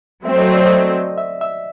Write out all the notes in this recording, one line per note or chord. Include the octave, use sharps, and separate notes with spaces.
F#3 A3 C4 E5
D#5
D5
D#5
E5
E5